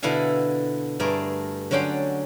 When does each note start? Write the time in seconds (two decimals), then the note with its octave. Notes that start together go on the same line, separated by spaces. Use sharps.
0.03 B2 D3 E4 A4 F5 G#5
1.00 G2 A3 G#4 A#4 D5
1.71 D3 F#3 C#4 D5 G5 C6